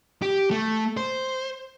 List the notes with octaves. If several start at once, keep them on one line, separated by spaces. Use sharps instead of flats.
G4
A3
C5